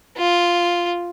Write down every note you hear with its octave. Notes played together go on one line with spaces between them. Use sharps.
F4